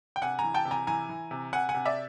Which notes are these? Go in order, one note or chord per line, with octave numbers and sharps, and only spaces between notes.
G5
C3 F#5 G#5
G#5 A#5
E3
G5 A5
C3
G#5 A#5
E3 G#5 A#5
E3
C3
C3 F#5 G#5
F#5 G#5
C3
D5 E5